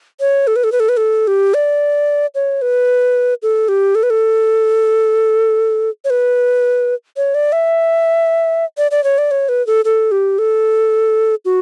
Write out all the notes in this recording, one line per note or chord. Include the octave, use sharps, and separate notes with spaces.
C#5
A4
B4
A4
B4
A4
B4
A4
G4
D5
C#5
B4
A4
G4
A4
B4
A4
C#5
B4
C#5
D5
E5
D5
D5
C#5
D5
C#5
B4
A4
A4
G4
A4
F#4